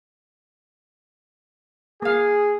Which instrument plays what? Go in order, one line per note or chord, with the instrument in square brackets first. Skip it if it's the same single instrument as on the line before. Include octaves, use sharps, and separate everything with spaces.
[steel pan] A#3 F5 [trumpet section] G#4